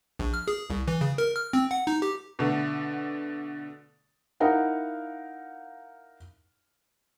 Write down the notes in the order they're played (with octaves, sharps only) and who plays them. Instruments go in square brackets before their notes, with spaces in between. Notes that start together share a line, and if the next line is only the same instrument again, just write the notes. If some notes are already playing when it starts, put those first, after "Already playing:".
[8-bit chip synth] A#1
F6
G#4
C2
E3
C#3
A#4
F6
C4
F#5
D#4
G4
[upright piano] B2 D3 A3
[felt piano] D#4 E4 A#4 F5 F#5